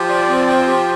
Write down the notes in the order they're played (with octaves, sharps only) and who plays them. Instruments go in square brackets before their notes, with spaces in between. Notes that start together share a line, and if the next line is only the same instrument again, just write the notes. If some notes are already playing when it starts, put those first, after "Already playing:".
Already playing: [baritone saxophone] F3 [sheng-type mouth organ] G4
[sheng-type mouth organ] D5
C4
G5
G4